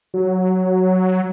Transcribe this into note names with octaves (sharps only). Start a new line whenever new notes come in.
F#3